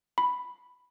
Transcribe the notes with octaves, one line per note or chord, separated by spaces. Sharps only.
B5